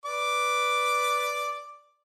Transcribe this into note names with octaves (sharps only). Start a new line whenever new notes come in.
B4 D5 D6